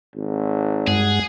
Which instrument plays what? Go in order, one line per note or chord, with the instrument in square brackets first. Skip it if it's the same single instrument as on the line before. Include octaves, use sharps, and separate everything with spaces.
[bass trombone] G#1
[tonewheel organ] G2 G#3 F#5 [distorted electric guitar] G#4